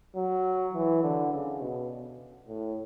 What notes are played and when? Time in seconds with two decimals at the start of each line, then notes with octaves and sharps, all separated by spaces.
0.16 F#3
0.74 E3
1.03 D3
1.33 C#3
1.61 B2
2.48 A2